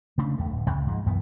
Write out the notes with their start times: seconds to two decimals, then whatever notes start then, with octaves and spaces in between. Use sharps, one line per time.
0.18 C#3 A3 C#4 D4
0.38 E2 A3
0.50 D1
0.67 C#2 C#3
0.87 G#2 F3 G#3
1.06 B1 F#2 E3 B3